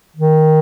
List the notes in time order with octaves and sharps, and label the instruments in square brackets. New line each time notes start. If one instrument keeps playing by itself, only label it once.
[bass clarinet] D#3